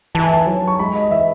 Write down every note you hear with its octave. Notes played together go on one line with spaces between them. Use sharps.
E3 A5
G#5
A5
F#3
C#6
G#3 B5
D#5
E3 E5